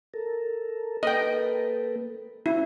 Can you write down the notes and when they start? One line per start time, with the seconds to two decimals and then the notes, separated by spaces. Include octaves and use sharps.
0.14 A4 A#4
1.03 A#3 A4 B4 D#5 G5
2.46 C#4 E4 F#4